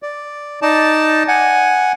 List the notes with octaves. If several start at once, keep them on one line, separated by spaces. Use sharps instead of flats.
D5
D#4 D5 A5
F#5 G#5